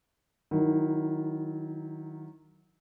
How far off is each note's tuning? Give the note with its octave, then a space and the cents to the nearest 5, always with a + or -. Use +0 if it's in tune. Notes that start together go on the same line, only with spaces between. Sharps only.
D#3 +0 F#3 +0 E4 -25